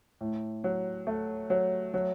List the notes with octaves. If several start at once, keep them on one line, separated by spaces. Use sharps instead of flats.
A2
F#3
A3
F#3
F#3